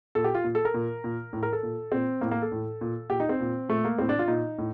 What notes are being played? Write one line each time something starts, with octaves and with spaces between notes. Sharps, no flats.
A#2 A4
G4
F4
A#2
A4
A#4
A#2
A#2
A2
A#4
A4
A#2
A#2 C4
A2 A#3
A#3
A4
A2
A#2
A#2 G4
D#4
C4
A#2
A#2 A3
A#3
A2 C4
D4
F4
A#2 D#4
A2